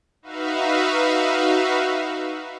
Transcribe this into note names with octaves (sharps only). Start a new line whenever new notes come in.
D#4 F#4 B4 E5 F5